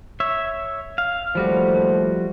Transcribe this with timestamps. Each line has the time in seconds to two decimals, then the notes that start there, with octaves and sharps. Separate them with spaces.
0.20 C#5 E5
0.98 F5
1.35 D#2 F3 G3 A3 F#4 C5